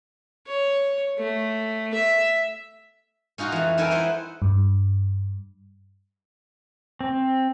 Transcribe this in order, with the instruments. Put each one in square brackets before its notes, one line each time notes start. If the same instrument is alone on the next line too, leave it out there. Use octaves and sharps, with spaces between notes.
[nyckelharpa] C#5
A3
E5
[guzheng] C#4 D#4 F4 F#4
F2 E3
C4 D#4 E4 A4 A#4 G#5
B4 C5 F#5 C6
[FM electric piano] G2
[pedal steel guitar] C4